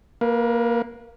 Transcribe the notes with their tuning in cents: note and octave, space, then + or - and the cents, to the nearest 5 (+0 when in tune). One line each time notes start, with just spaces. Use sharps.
A#3 +0 B4 -30